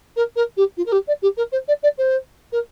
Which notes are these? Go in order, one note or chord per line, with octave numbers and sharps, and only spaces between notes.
A#4
A#4
G4
F4
A#4
G4
D5
G4
A#4
C5
D5
D5
C5
A#4